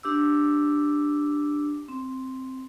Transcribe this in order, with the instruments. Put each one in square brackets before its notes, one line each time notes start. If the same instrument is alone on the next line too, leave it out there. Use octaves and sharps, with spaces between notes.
[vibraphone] D4 G4 D6 E6
C4